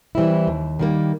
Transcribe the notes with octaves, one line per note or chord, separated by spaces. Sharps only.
E3 G3 C4 E4
D#2
D#3 G3 A#3